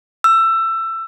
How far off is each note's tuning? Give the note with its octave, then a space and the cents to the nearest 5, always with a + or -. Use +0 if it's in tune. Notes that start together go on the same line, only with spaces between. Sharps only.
E6 +20